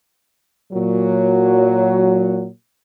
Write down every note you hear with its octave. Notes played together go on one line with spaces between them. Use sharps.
A#2 F#3